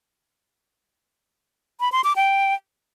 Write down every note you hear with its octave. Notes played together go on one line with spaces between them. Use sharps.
B5
C6
D6
G5